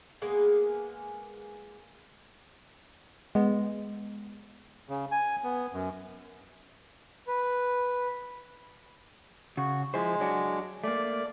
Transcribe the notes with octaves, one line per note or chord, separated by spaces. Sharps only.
G#3 A#3 B3 G#4
G#3 B3
C#3
G#5
B3
F#2
B4
C#3 F#4
F3 G#3 E4 C5
F#3 D4 F#4
A3 A#3 D5